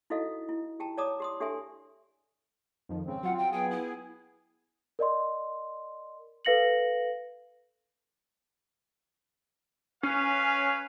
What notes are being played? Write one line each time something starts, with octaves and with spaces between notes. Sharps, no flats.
D#4 E4 F#4 A4 D#5 F5
E4
G4 G5 A5 A#5
C#5 D5 A5 A#5 D6 D#6
G4 C6 D#6
D4 G4 A4 E5 G#5 C6
F2 D#3 F3
G#2 C#3 C4
F#3 F4 F#5
G5
B3 G#4 G5 G#5
E4
A#4 D5 D#5 C6
A4 B4 F5 A#6 C#7 F#7
C#4 B4 C#5 F5